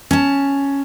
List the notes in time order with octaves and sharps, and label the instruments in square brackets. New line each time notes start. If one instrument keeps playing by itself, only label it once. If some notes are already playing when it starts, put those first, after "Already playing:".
[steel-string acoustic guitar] C#4 A5